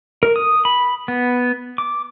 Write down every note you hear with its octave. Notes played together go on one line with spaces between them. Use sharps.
A#4
D#6
B5
B3
D6